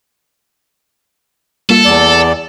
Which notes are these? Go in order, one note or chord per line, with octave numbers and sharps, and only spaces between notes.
G3 A#3 F4 A4
E2 D5